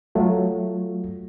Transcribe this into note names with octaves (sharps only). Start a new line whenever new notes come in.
F#3 A3 F4